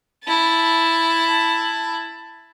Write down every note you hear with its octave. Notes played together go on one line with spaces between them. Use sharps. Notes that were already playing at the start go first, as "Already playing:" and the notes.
E4 A5